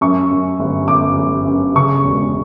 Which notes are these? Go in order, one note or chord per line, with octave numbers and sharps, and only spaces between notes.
F#2 C#6
F#2
G1
G1 D6
G1
F#2
C#3 C#6
E1